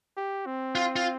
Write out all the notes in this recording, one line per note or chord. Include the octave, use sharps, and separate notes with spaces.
G4
C4
F4
F4